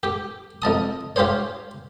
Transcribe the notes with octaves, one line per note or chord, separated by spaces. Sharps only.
G4 D6
F2 D#5 A5 D#6
F4 G4 G#4 C5 C#5